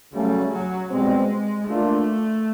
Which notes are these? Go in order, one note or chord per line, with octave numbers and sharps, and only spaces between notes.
C#3 F#3 G3 A3
F#3
B2 G3 G#3 C4
A3 A#3 D4 F4